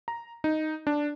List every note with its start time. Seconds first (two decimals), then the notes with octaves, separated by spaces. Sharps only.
0.08 A#5
0.44 D#4
0.87 D4